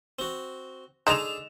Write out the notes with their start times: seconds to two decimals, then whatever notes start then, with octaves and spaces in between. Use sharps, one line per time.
0.19 C4 F#4
1.07 G#3 D4 D#4 G#4 A4 E7 F7